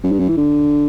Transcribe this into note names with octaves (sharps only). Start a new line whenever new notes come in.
F#2
G2
F#2
E3
D3